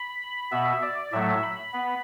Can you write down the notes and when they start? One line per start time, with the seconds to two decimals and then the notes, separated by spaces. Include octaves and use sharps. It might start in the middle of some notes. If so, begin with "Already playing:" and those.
Already playing: B5
0.51 B2 B3 E5
0.82 D5
1.12 A2 F#3 A3 E5
1.43 B5
1.73 B3